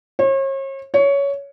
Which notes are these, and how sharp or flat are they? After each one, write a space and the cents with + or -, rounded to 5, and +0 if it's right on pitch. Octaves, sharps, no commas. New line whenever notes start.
C#5 -40
C#5 +15